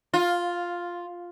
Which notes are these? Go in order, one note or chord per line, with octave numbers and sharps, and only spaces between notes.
F4